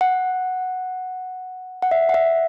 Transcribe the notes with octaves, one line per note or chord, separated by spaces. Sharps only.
F#5
F#5
E5
F#5
E5